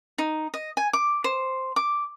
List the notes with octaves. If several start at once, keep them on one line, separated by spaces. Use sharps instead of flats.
D#4
D#5
G#5
D6
C5
D6